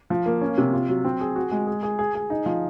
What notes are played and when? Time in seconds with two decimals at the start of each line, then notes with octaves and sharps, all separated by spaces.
0.10 F3
0.26 A#3
0.41 C#4
0.58 C3
0.73 F4
0.89 F#3
1.05 C4
1.21 G#4
1.36 F#4
1.52 G#3
1.67 G#4
1.83 G#4
1.99 G#4
2.15 G#4
2.30 D#4
2.46 F3